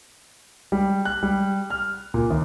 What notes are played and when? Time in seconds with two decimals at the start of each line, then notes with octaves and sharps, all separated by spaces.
0.72 G3
1.05 F#6
1.23 G3
1.70 F6
2.14 A#2
2.30 D#2